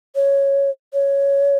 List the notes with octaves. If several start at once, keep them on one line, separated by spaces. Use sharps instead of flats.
C#5
C#5